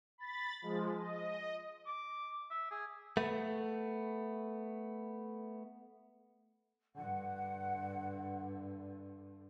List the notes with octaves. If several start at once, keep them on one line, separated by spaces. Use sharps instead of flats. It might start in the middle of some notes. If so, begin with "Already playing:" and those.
B5 A6
F3 G#3
D#5
D6
E5
G#4
A3 B3
G2 D3 F#5